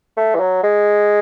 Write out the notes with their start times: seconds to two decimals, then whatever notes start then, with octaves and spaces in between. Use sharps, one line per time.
0.17 A3
0.35 E3
0.40 F#3
0.63 G#3